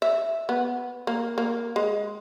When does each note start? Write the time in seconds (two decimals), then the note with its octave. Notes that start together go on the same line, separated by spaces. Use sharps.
0.02 E5
0.49 B3
1.07 A#3
1.38 A#3
1.76 G#3